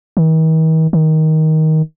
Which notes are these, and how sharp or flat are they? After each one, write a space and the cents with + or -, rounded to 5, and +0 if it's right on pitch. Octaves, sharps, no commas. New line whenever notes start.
D#3 +45
D#3 +15